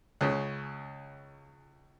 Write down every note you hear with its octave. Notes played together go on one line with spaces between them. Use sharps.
C#2 C#3